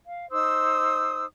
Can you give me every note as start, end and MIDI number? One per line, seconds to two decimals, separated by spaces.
0.06 0.29 77
0.31 1.26 63
0.31 1.26 72
0.31 1.26 87
0.31 1.26 88